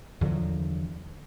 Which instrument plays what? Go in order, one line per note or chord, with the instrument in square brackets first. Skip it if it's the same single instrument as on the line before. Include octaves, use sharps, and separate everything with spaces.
[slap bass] E2 D3 F3 F#3